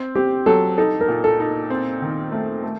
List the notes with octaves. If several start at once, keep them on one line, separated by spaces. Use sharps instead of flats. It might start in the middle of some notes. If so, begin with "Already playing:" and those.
Already playing: C4
C4 G4
F#3 A4
D#4 A4
A#4
A#2
A4
D#4
C4
D#3
A3
A3